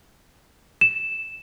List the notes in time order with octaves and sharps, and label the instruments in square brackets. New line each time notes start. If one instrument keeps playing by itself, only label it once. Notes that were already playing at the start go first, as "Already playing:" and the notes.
[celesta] E7